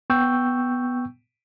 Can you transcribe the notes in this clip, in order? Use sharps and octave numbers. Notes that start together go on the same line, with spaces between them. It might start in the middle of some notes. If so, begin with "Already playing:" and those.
B3 G5 C#6 E6 G6